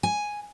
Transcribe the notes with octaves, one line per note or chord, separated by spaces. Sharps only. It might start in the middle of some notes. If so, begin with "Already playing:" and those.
G#5